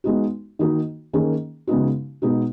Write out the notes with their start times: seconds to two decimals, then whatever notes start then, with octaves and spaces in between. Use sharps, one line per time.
0.04 G#3 B3 D#4 F#4
0.59 D#3 A#3 D#4 F#4
1.13 D#3 A#3 C#4 G#4
1.67 C#3 G#3 B3 D#4 F#4
2.22 B2 G#3 B3 D#4 F#4